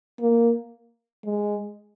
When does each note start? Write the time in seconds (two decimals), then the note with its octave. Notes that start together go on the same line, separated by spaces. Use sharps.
0.21 A#3
1.25 G#3